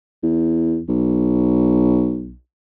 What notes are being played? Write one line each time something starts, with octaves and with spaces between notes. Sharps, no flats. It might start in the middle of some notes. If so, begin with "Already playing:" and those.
E2
B1